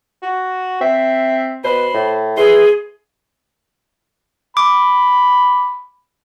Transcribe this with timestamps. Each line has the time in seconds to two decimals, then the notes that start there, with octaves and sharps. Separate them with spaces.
0.22 F#4
0.81 C4 E5
1.64 B2 C5 B5
1.94 A2
2.37 E3 G#4 C6
4.57 B5 D6